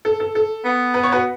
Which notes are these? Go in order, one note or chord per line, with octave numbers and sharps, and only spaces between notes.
A4
A4
A4
B3
B4
C#5
F#4 B4